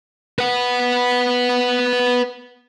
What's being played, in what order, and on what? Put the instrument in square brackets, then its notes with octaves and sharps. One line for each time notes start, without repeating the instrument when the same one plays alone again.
[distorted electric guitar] B4 F#5